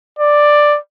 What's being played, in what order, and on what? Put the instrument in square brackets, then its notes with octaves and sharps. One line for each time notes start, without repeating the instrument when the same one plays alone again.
[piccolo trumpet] D5